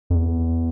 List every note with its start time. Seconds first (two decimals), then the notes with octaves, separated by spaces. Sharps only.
0.10 F2
0.15 E2